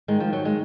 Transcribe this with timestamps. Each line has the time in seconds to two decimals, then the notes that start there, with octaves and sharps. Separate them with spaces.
0.08 G#2 D#3 G#3
0.20 F3
0.33 F#3
0.45 G#3